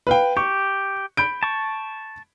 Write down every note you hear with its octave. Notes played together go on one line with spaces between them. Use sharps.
B4 F5 G5
G4 C#6
B5 G6 D7
A5 C#6